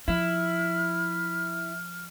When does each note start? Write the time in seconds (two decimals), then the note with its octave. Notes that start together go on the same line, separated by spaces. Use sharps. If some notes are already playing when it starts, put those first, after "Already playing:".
0.08 F3 E4 F6